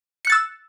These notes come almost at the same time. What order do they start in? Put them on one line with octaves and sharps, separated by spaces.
C#7 F#6 A6 E6